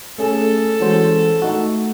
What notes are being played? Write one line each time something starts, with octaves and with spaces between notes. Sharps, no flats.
A3 C#4 G#4 A4
E3 G#3 C#4 F#4 C5
A3 D#4 F#4